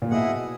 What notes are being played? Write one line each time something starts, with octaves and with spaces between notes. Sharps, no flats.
A#2
B2 E4 G#4 D#5 F#5